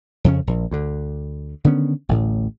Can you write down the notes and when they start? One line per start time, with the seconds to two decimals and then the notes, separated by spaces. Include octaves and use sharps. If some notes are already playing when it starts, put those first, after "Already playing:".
0.24 F2 C#3 C#4
0.47 A#1
0.71 D2 D3
1.65 D3 D#3 B3 C#4
2.09 A1 D2 A2